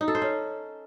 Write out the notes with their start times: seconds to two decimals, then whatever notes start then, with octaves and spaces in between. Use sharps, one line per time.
0.01 D#4
0.08 A4
0.15 C5
0.22 C#4